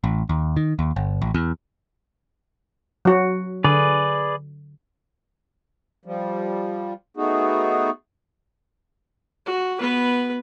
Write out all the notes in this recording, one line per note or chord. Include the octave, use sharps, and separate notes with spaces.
A1
D#2
D#3
D#2
G1
A1
E2
F#3 F#4
D3 G#4 B4 D5
F3 G3
A3 B3 D#4 F#4 G#4
F#4
B3 B4